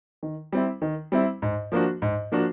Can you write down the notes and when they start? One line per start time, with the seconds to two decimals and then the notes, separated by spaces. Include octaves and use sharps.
0.23 D#3
0.53 G3 C4 E4
0.82 D#3
1.12 G3 C4 E4
1.42 G#2
1.72 F3 A#3 D4 F#4
2.02 G#2
2.32 F3 A#3 D4 F#4